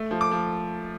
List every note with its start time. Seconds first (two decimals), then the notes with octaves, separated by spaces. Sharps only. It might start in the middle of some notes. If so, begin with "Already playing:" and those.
Already playing: A3
0.11 F3
0.21 D6
0.31 F3